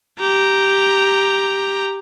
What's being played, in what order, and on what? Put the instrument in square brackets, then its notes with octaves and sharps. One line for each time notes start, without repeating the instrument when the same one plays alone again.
[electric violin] G4 A#5